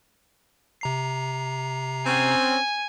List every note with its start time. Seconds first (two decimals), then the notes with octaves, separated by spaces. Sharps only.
0.81 C3 A#5 C7
2.06 C4 C#4 G#5